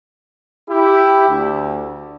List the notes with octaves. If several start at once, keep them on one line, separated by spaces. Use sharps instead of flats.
E4 G4
D2